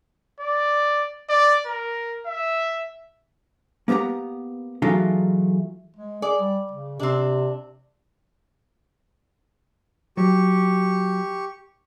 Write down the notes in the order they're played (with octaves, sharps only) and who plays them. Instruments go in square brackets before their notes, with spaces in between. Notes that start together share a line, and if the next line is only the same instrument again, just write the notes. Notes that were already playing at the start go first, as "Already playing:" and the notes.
[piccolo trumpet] D5
D5
A#4
E5
[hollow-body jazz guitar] A#3 B3 G4 F#5 A#5
E3 F#3 G#3 A3 D#4 F4
[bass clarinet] G#3
[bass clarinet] G#4 [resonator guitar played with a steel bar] D5
[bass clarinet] G3
C#3
[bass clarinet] C3 [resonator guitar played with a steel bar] C4 D4
[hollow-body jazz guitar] F#3 [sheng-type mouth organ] G4 C#6